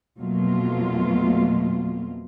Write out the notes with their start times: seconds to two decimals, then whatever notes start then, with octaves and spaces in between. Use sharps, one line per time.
0.18 F2 B2 F#3 A3 A#3 F4